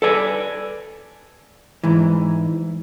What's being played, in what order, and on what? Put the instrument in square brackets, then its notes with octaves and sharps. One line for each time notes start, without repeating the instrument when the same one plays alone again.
[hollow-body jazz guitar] A4 B4 D5 G#5
G#2 E3